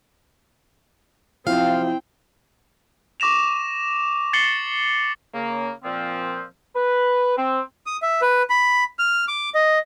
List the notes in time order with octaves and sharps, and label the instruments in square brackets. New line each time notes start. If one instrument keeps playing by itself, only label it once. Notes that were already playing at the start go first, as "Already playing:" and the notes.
[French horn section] F#2 C3 F3 [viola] C4 G5 [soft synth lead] E4 [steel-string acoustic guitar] F5
[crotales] C#6 D6 A#6 E7 F7
A6 C7 C#7 F#7 G7
[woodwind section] C#3 A#3
A#2 F3 C4
B4
C4
[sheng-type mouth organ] D#6
E5
B4
B5
F6
D6
D#5